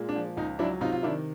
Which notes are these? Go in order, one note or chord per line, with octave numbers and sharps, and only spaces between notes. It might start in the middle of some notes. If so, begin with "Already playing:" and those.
Already playing: A#2 G#3
D4
F3
C#2 D#4
F#3 D4 E4
C3 D#4 F4
F4
D#3 D4 E4